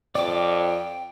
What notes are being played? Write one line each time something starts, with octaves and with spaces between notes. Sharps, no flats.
F2 D5 G5 D6